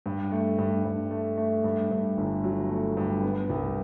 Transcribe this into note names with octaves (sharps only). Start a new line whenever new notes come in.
G2
A3
G2
G2
A3
A3
G2
G2
G1
F#3
A3
G2
B3
C2